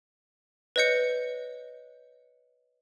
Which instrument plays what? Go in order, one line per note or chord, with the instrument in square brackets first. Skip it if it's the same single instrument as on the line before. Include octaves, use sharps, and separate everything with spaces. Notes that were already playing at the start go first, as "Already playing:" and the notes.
[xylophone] B4 C#5 D#5 G6 C#7